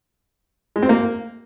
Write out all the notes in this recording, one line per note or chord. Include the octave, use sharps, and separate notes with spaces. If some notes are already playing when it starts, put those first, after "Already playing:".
G#3
C4
A#3